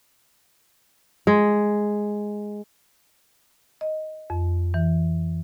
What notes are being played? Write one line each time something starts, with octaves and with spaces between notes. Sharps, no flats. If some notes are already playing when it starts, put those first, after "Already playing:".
G#3
D#5
F2
E3